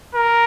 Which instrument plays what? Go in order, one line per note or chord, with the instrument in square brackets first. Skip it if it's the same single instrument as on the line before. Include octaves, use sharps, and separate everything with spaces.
[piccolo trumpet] A#4